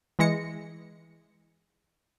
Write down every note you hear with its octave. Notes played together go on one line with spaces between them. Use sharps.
E3 G#3 A#6 C#7